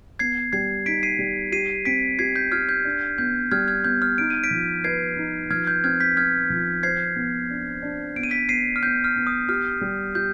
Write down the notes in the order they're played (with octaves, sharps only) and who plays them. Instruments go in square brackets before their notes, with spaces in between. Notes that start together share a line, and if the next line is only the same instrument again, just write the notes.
[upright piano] B3 [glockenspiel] G#6 C7
[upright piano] G3 [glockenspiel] G#6 C7
[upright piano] D#4 [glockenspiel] B6 D7
[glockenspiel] C7 D#7
[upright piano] G3
[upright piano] G4 [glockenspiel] C7 D#7
[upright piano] C4 [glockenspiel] B6 D7
[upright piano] G4 [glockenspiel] G#6 C7
[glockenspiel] G6 B6
[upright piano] G4 [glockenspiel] F6 G#6
[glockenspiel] G6
[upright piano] D4
[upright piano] B3 [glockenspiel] G6
[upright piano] G3 [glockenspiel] F6 G#6
[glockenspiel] F6 G#6
[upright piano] B3 [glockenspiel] G6
[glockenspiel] F6
[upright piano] D#4 [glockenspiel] D7
[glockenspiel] D#7
B6 D7
[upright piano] F3
[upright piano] B4 [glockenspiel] G#6 C7
[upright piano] D#4
[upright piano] F3 [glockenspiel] F6 G#6
[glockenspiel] G6
[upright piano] C4 [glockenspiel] F6 G#6
[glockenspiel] G6 B6
[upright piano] C4 [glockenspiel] F6 G#6
[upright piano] F3
[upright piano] C5 [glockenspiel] G#6 C7
[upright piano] B3
D4
D4
[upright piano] B3 [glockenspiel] D7
[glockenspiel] D#7
B6 D7
[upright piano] B3 [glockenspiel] C7 D#7
[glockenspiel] F6
[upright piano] B3 [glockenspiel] G6
[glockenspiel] F6
[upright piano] B3
[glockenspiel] D#6
[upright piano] G4 [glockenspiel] F6
[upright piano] G3
[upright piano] G4 [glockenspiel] G6